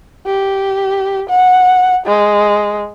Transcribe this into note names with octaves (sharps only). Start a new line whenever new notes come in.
G4
F#5
G#3